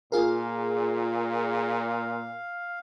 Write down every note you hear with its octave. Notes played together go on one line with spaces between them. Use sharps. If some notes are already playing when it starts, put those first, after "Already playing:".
A#2 F4 G#4 A#4 F5